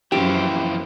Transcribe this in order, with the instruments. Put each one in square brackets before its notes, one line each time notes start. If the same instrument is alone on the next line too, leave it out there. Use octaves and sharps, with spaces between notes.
[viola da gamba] F#2 F3 C5 [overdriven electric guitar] E3 A#3 [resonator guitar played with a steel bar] G4